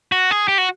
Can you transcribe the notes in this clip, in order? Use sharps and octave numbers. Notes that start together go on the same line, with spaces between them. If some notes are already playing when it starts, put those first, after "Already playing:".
F#4
G#4
G4
F#4